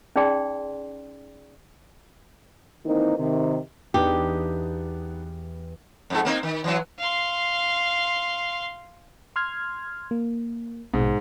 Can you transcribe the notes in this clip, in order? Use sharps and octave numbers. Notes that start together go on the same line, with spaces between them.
C#4 D#4 G#4 D5 G5 C6
D#3 E3 A#3 C4 D#4 E4
C3 D#3
E2 B3 D4 D#4 G4
F2 G#2 A4
A#3 C4 D#4
D#3
E3 F#3
F5 C6
C6 F6 G#6
A#3
A#1 G#2 B2